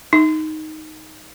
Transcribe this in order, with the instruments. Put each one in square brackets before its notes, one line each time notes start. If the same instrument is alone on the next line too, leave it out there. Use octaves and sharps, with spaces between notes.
[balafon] D#4